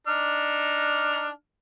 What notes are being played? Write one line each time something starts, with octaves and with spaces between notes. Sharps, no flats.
D4 D#4 F6